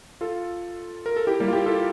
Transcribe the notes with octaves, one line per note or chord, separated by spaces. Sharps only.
F4 A4
A#4
A4
E4 G4
G3 A#3
F4
E4 G4
F4 A4